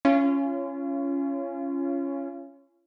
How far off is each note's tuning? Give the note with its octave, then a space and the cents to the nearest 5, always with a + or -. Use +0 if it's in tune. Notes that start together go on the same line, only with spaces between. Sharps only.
C#4 +0 F4 -35